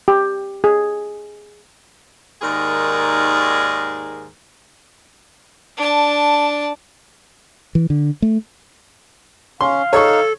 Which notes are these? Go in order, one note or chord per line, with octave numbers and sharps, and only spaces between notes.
G4
G#4
D#2 G#2 D#3 G#4 A#4 D5
D4 A5
E3
D3
A3
C#4 F5 C6
D#4 A4 C#5 C#6